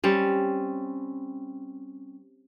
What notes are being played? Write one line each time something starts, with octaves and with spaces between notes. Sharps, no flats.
G3 C4 C#4